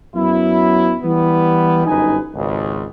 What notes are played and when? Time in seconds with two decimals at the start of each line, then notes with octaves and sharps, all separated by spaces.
0.14 F#2 F#3 B3 E4
1.03 E3 G3 B3
1.86 G1 F#2 D#4 B4 G#5
2.35 G#1 C#2